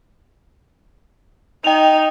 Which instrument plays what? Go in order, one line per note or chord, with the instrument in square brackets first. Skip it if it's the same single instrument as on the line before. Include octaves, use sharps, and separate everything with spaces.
[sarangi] D#4 [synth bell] G5 F7